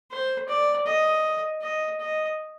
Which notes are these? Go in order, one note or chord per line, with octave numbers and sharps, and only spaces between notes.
C5
D5
D#5
D#5
D#5